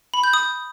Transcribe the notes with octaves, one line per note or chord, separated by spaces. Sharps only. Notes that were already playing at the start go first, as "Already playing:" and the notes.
B5
G6
D#6